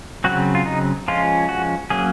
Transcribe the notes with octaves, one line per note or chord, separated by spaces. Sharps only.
C#3 F#3 C4 F#4
F4
D#4
F3 G#3 C#4 F4
F#4
F#3 A#3 C#4 G#4